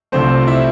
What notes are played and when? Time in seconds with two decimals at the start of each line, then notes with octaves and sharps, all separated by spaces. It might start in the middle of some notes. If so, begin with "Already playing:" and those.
0.12 C2 C3 F3 A3 C4 C5
0.47 E4 E5